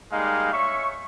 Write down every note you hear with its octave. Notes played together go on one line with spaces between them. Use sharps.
G3 G#3 A#3 D#4 F5
C#5 E5 C#6